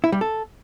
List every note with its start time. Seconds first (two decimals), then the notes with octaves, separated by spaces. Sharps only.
0.04 E4
0.12 G3
0.21 A4